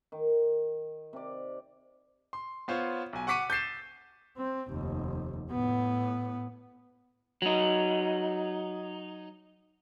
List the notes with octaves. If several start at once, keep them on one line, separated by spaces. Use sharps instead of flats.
D#3
C3 D5
C6
B3 F4 C5 C#5
B1 G#5
F#5 C#6 D6 B6 C#7 D#7
G6 A6 C7 E7
C4
F1 D#2
A2 B3
F#3 D#4